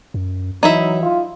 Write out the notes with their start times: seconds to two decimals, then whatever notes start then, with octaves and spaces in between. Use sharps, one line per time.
0.14 F#2
0.63 E3 F#3 D#4 E4 E5
1.03 F4